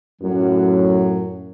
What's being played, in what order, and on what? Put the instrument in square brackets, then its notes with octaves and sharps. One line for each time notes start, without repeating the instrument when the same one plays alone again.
[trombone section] F#2 A2 [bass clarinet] F#3